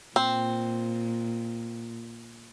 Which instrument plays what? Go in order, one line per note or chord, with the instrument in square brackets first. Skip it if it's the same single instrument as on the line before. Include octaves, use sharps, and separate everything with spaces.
[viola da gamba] A#2 [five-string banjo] C4